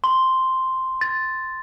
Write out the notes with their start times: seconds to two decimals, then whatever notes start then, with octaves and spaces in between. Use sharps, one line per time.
0.04 C6
1.01 A6